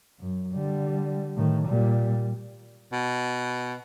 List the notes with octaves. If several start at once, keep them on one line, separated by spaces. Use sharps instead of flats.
F#2
D3 G3
A2 D#3
A#2 G3
B2